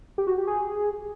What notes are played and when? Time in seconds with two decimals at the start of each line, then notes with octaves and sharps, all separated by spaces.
0.18 G4
0.27 F#4
0.38 G4
0.47 G#4